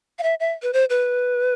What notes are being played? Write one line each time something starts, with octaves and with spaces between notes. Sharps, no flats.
F5
E5
E5
B4
C5
B4